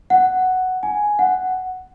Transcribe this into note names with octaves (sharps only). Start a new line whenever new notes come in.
F#5
G#5
F#5